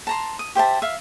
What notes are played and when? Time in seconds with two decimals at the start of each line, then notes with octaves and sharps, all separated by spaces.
0.07 A5 A#5 C6
0.39 D#6
0.55 G4 C5 E5 A5
0.82 E5 F5